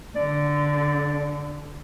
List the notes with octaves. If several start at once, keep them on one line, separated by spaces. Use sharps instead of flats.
D3 D5